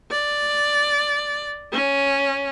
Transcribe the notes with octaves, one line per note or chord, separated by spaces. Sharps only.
D5
C#4